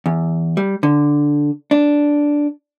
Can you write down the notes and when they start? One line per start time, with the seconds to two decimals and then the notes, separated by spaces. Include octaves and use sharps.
0.06 E2
0.57 G3
0.83 D3
1.71 D4